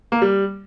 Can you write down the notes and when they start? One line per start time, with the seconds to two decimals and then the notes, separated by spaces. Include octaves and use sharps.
0.12 A#3
0.22 G3